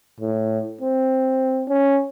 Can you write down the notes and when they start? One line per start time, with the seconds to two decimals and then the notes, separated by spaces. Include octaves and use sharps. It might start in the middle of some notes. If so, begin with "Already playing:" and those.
0.20 A2
0.81 C4
1.68 C#4